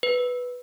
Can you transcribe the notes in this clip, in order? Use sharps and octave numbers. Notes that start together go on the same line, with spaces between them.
B4